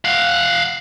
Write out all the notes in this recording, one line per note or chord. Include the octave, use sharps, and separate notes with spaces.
F5 F#5